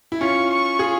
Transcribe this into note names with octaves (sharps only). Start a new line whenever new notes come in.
E4
C#4 F4 C#6
C#6
F4 G#4